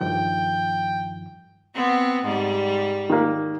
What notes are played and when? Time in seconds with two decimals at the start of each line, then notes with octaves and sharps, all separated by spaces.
0.01 G2 D#3 F3 G5
1.75 B3 C4
2.25 G#2 G3
3.10 D#3 A#3